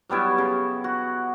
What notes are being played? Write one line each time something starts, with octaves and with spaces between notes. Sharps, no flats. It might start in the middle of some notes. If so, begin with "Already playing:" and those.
F#3 G3 B3 E4
C#3
F#4